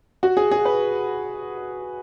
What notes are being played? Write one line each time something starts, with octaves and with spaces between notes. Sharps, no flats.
F#4
G#4
G#4
B4